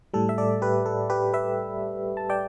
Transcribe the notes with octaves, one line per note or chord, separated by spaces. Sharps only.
A2 G3 A4
E5
A4 D5
G4 B4
A4
G4 B4
B4 E5
A5
D5 G5